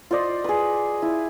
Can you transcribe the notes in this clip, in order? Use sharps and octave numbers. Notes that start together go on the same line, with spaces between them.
F4 C5 D5 D#5
G#4 B4
E4